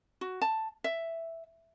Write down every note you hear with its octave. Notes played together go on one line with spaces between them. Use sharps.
F#4
A5
E5